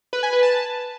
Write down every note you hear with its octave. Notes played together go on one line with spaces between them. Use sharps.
B4
G#5
B4
A5